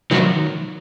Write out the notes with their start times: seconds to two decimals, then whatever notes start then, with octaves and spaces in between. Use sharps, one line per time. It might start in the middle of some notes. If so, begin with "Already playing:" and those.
0.11 D#3 F#3